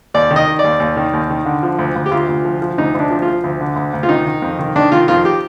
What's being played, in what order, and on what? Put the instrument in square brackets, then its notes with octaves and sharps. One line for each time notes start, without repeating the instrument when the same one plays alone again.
[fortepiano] D#2 D5
D#3
D#5
D#3
D#2 D5
D#2
D#3
D#2
D#3
D3
F3
D2
D2
G4
D2 F4
D2
F3
F3
D2 D#4
D2
D4
F3
F4
F3
D2
D3
D2
D2
F4
D#3 D#4
D#3
F2
D#3
D#3 D4
D#3 F4
F2 F4
G4